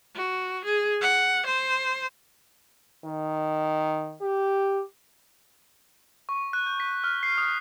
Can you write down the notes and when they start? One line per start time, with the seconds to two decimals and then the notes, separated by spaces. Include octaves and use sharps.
0.16 F#4
0.65 G#4
1.01 F#5
1.47 C5
3.04 D#3
4.21 G4
6.29 C#6
6.53 F#6
6.66 G6
6.80 B6
7.04 F6
7.23 C7
7.38 D#6